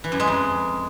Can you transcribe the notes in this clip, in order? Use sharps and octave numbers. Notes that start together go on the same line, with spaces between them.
E3
F#2
G#3
F2